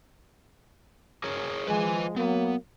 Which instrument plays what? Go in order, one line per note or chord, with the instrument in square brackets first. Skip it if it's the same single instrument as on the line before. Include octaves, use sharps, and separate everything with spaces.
[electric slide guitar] G#4 A#4 C#5
[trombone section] F3 G#3 [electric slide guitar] B4 G#5
[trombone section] F#3 A#3 [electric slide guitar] B3